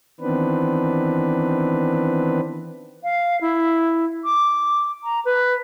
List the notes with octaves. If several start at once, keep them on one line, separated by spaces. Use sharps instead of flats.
D#3 E3 B3 C4 D4 B4
F5
E4
D6
A#5
B4